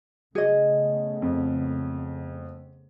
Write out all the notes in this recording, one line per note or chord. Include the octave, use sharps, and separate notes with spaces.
C#3 A3 B3 G#4 D#5
F2